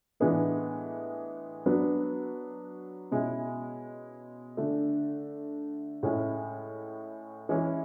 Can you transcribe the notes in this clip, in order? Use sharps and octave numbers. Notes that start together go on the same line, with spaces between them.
A2 E3 G#3 B3 D4
F#3 B3 D4
B2 G#3 C#4 E4
D3 A3 D4
A2 G#3 C#4 E4
E3 G#3 C#4 E4